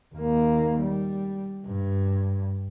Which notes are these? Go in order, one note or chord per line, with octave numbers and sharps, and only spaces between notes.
D#2 A#3
G3
G2